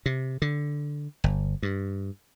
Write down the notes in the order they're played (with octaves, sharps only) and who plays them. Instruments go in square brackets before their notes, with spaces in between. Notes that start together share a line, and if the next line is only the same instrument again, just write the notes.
[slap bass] C3
D3
G1
G2